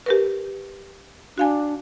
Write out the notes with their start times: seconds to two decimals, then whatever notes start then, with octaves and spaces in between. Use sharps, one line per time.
0.06 G4 A#4 B4
1.38 D4 F#4 F5 G#5